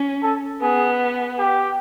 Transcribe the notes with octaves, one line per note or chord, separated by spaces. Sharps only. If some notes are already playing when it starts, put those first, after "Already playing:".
Already playing: C#4
A4
B3 G#4
G4